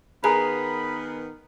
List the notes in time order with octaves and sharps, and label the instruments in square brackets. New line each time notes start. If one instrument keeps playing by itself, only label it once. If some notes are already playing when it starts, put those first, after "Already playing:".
[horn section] D#3 B3 [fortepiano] G#4 A#4 B4 [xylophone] A#5 [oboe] B5